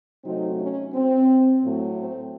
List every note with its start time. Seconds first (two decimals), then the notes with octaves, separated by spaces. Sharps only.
0.24 C3 F#3 A3 C4 D#4
0.59 C#4
0.94 C4
1.63 A2 F#3 A3
1.97 C4